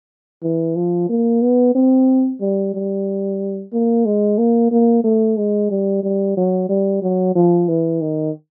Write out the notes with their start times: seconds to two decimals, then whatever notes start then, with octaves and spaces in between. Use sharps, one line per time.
0.43 E3
0.76 F3
1.09 A#3
1.42 B3
1.75 C4
2.41 G3
2.74 G3
3.73 A#3
4.06 G#3
4.38 A#3
4.72 A#3
5.04 A3
5.37 G#3
5.71 G3
6.03 G3
6.37 F#3
6.69 G3
7.02 F#3
7.35 F3
7.68 E3
8.01 D#3